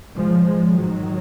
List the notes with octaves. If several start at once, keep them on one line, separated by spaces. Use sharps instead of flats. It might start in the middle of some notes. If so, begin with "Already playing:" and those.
G#2 F3 G#3
F3 G#3
D#3 F#3